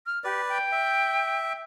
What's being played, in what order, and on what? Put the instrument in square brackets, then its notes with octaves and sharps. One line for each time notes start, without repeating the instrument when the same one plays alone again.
[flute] F6
[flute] G4 [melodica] B4 D5
[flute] G5
[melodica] E5